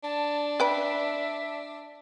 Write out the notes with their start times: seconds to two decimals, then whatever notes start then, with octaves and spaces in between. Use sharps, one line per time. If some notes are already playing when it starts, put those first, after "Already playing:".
0.03 D4 A5
0.60 B4 E5 G5 B5